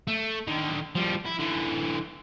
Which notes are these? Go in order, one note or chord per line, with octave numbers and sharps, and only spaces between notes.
A3
D3 D#3
F3 G3
E4
D3 E3